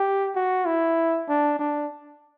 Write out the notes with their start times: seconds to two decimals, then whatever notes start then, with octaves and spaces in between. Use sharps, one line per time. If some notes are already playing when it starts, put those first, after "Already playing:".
Already playing: G4
0.36 F#4
0.66 E4
1.29 D4
1.59 D4